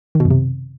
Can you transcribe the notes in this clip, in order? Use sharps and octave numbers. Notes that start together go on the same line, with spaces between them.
D#3
B2
F#2
C3